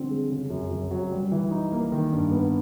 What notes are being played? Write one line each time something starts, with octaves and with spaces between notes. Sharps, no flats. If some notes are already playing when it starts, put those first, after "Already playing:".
Already playing: D3 F3 G3 C4
G#3
C#3
F#2
F#2
F#3
G3
E3
D#4
A#3
D#3
G2
B3